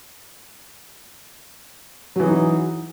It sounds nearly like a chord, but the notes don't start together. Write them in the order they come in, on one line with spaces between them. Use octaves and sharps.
F#3 E3 G#4 D#4